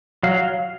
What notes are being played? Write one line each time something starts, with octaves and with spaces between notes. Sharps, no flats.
F#3 F5